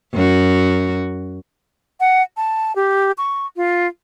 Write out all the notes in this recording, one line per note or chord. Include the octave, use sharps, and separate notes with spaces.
F#2 F#4
F#5
A5
G4
C#6
F4